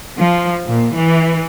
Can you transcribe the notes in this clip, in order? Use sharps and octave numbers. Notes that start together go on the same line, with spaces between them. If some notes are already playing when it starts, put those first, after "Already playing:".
F3
A#2
E3